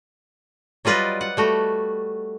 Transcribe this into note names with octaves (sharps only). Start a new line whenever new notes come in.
F#3 G3 F4 B4 D5 D#5
F#5
G3 A3 F#4